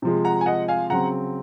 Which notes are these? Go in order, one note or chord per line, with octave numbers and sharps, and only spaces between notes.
C3 F3 G#3
F#5 A#5
G#5
D#5 F#5
F5 G#5
C#3 F#3 C4 F#5 A#5